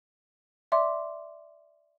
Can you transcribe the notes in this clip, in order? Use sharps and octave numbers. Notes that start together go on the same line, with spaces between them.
D5 E5 C6 D6